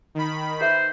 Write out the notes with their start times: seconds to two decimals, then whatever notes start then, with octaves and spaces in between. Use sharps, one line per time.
0.15 D#3 B5
0.61 G#4 B4 C5 E5